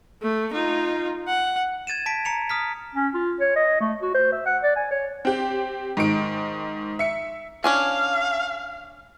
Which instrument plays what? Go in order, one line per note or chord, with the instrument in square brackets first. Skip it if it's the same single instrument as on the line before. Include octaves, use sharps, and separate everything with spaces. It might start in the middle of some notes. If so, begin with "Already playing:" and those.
[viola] A3
D#4 F4
F#5
[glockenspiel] G#6 A6 D#7 E7
A5 B6 D7
A#5 C#7 F7
D#6 F6 B6
[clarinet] C#4
F4
C#5
D#5
A3
F#4
C5
E5
F#5
D5
G#5
C#5
[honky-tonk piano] C4 G4
G#2 D#3 D7
E5 C#7
[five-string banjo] C#4 D4 G#5 [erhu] F5